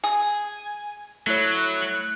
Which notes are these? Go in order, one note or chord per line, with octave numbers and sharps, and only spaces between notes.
G#4 G#5
F#3 A3 E4 C#5 F#6